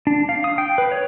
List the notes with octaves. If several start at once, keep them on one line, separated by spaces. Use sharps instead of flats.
D4
F5
D#6
G5
B4
C#5